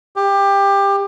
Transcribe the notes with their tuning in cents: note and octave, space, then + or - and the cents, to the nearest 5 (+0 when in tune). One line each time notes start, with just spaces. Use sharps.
G4 +20